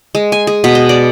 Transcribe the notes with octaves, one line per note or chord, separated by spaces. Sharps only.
G#3
G#5
G#4
B2
D#5
D5